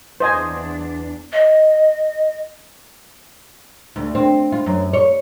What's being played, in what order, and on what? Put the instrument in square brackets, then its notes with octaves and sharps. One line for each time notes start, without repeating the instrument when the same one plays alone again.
[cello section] E2 B3 D4 [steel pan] C5 D#5 G#5
[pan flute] D#5
[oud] D2
C4
F4
F#2
C#5